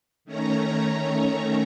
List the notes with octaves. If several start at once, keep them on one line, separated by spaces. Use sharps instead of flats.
D#3 A3 C#4 C#5 A#5